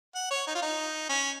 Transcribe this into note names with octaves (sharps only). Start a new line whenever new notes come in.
F#5
C#5
D#4
F4
D#4
C#4